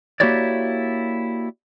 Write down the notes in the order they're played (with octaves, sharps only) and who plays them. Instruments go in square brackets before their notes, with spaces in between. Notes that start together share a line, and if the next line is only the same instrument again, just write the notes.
[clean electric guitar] A#3 E4 F#4 G4 C#5 D5